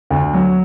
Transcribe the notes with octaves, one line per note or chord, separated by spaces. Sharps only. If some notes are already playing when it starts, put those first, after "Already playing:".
D2
F#3